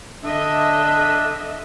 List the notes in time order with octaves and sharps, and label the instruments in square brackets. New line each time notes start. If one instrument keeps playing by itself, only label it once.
[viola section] D3 D#5 E5 [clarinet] D4